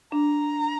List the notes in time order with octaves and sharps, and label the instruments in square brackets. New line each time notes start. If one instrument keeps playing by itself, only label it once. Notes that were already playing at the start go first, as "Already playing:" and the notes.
[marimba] D4 [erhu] A#5